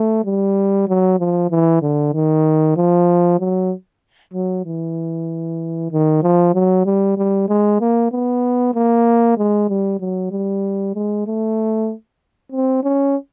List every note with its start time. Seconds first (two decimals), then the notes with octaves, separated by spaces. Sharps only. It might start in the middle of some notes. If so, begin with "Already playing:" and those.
Already playing: A3
0.25 G3
0.88 F#3
1.19 F3
1.50 E3
1.82 D3
2.13 D#3
2.77 F3
3.39 F#3
4.33 F#3
4.65 E3
5.91 D#3
6.23 F3
6.54 F#3
6.86 G3
7.17 G3
7.49 G#3
7.80 A#3
8.12 B3
8.74 A#3
9.37 G#3
9.69 G3
10.00 F#3
10.31 G3
10.95 G#3
11.27 A3
12.52 C4
12.83 C#4